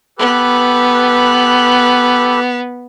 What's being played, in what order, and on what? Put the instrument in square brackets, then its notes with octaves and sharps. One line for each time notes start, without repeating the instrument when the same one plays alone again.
[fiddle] B3 [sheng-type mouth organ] G4 A4 B4